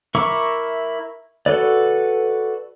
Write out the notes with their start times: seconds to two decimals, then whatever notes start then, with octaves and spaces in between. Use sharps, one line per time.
0.15 E4 A#4 E5 C#6 D6
1.46 F#4 A4 B4 D5